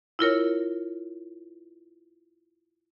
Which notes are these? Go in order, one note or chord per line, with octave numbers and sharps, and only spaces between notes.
E4 F4 A#4 C#5